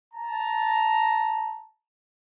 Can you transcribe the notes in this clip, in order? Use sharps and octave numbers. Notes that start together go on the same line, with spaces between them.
A5 A#5